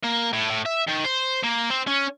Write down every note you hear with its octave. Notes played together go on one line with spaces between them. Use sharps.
A#3
A2
A2
E5
D#3
C5
A#3
C4
C#4